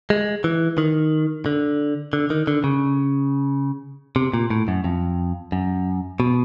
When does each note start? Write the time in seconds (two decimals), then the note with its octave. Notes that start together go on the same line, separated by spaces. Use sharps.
0.10 G#3
0.44 E3
0.78 D#3
1.46 D3
2.13 D3
2.30 D#3
2.47 D3
2.64 C#3
4.16 C3
4.34 A#2
4.50 A2
4.68 F#2
4.84 F2
5.52 F#2
6.20 B2